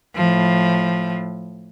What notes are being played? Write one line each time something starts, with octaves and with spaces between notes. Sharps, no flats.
A2 F3